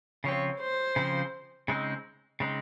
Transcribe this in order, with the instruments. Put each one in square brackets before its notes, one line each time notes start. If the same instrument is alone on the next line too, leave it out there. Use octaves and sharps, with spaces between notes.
[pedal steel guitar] C#3 F3 C4 [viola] C#5
[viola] C5
[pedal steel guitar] C#3 F3 C4
C#3 G#3 C4 D#4
C#3 G#3 C4 D#4